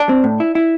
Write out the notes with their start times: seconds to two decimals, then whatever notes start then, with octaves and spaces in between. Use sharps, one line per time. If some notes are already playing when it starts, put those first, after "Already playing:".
Already playing: D4
0.09 C4
0.24 A2
0.40 E4
0.55 E4